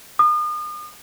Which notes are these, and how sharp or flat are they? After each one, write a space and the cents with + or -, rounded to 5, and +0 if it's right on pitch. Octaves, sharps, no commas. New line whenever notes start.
D#6 -40